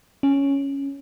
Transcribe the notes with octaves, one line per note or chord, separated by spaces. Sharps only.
C#4